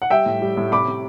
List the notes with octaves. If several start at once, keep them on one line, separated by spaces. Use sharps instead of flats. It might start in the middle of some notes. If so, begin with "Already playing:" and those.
F#5
G3 E5 G5
A2
G3
A2
C3 B5 D6
C3